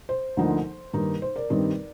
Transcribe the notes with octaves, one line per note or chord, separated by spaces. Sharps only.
C5
D2 D3 F3 A#3 D#4
G2 D#3 A#3 D#4
C5
A#4 D5
G2 D#3 G3 C4 D#4